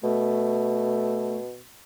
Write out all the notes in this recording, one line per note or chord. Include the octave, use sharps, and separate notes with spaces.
B2 A3